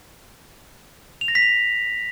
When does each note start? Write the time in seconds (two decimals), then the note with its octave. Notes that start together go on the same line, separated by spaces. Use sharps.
1.21 F7
1.28 A#6
1.35 B6
1.42 F7